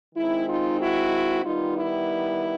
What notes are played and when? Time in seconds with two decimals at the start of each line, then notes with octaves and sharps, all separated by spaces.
0.15 D#3 G#3 C4 D#4 E4
0.47 D#4 F4
0.79 E4 F#4
1.44 D#3 G3 B3 D#4 F4
1.76 E4